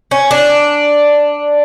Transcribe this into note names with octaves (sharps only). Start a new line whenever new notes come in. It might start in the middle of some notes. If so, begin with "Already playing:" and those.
C#4
D4